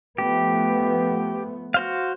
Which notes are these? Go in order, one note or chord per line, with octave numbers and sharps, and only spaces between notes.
F3 A3 B3 G4
F#4 C5 F5